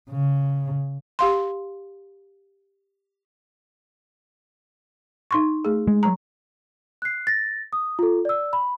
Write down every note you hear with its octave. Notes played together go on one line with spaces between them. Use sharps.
C#3
G4 F5 C6
D#4 C6 C#6
A3 G#4
G#3
F#3 A#5
F#6 C7
A6 A#6
D#6
F4 A4
D5 E6
B5